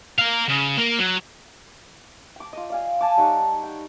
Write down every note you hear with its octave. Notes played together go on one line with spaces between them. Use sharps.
A#4 F5
C#3
A#3
F#3
G5 D6
F4 D#5
D5 F5 G#5
G#5 A5 D6
G3 D#4 C#5 F#5
G5